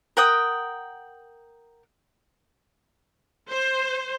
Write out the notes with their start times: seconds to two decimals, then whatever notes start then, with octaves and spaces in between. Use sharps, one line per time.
0.17 A#4 F#5 G5 D#6
3.50 C5